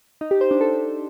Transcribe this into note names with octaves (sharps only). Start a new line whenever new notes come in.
D#4
G4
C5
D4
A4